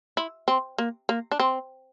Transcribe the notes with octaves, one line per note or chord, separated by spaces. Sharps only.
E4
C4
A#3
A#3
D4
C4